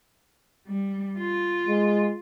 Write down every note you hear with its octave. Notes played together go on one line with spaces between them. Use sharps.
G3
F4
G#3